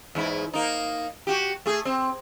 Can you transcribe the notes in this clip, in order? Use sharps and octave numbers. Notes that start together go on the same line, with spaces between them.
E2 G#2 E4
A#3 D#4
F#4 G4
A3 G#4
C4